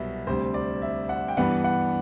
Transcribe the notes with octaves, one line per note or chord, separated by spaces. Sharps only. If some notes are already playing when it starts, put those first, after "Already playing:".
Already playing: C2 B2 F#3 B3 E5
D2 C3 G3 C5
D5
E5
F#5
G5
G2 E3 B3 D4 F#5
F#5